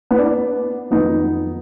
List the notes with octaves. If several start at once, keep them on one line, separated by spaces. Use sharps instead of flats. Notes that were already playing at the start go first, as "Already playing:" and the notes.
B3
D4
B3
F2 D#3 F#3 B3 D#4